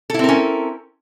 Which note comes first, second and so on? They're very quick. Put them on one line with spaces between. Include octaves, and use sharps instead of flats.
A4 E4 C4 A#4 C#4